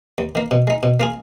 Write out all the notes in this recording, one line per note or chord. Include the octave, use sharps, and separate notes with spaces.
D#2
D#3 A#3
B2
G#3 D#4
B2
A#3 F4 G#4